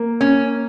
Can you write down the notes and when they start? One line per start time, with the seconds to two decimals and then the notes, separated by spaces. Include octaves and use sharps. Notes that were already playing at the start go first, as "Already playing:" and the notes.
Already playing: A#3
0.21 C#4